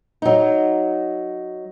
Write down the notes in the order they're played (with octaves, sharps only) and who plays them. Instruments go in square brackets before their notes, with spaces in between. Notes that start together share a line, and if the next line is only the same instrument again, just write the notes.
[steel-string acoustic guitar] F#3 D#4